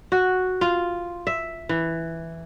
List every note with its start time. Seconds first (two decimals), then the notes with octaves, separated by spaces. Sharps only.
0.12 F#4
0.61 F4
1.27 E5
1.69 E3